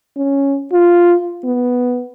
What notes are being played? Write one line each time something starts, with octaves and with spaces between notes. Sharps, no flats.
C#4
F4
B3